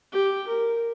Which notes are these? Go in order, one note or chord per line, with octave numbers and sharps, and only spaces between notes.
G4
A#4